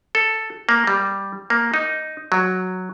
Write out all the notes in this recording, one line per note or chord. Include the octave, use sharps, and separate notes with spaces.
A4
A#3
G3
A#3
D#4
F#3